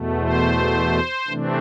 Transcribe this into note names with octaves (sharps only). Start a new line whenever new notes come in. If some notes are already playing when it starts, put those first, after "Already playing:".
Already playing: E2 B2 A3
C5
C3 E3 A3 C4 D4